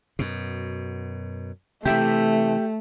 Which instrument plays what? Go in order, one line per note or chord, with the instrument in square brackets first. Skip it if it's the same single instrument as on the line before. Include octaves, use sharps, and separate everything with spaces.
[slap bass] F#2 B2
[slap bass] C3 E3 [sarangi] A3 [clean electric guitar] G4 E5